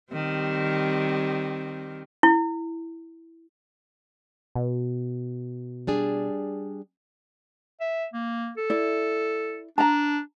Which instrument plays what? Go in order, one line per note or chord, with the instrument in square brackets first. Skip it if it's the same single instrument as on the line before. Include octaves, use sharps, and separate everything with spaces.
[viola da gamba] D#3 G3 C4
[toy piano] E4
[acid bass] B2
[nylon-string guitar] G3 D4 G#4
[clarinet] E5
A#3
A4
[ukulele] E4 D5
[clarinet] D4 [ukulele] A5 A#5